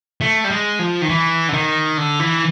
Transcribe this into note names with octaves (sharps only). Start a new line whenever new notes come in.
A3
G3
G#3
F3
D#3
E3
D3
D#3
D3
E3